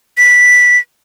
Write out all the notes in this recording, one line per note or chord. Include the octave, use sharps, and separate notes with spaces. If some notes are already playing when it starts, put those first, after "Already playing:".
B6